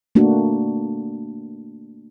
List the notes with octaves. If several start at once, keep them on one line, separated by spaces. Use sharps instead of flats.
A3 A#3 D4 F#4